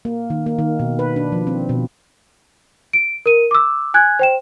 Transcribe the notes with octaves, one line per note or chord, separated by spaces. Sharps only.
A#3
D#3
A#3
D#3
B2
B4
D4
F3
C4
B2
D7
A#4 D#7
D6 E6
G#5 F#6 G#6
C5 G5 E7